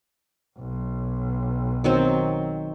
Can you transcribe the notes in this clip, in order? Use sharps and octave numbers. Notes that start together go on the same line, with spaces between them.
B1
D#3 F#3 C4